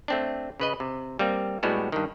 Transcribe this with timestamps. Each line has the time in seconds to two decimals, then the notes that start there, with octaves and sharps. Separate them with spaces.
0.08 A3 C4 D4
0.60 C#3 B4 D#5
0.80 C3
1.19 G3 A#3 C4
1.63 A2 G3 G#3 B3 F#4
1.92 G2 D#3